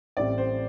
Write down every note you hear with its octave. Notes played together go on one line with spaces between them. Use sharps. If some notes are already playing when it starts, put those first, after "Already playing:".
A1 A2 G3 C4 D5
C5